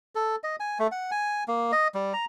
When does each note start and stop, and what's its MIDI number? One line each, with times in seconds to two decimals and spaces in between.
0.15 0.36 69
0.44 0.56 75
0.60 0.78 80
0.79 0.87 57
0.92 1.11 78
1.11 1.44 80
1.48 1.72 58
1.72 1.88 75
1.94 2.13 55
2.13 2.25 82